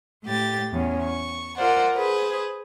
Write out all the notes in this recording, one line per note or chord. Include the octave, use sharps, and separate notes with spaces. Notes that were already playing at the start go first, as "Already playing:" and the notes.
A2 G4 A6
E2 C#4
C#6
F4 A#4 C5 D5 F#5
G#4 B4 C5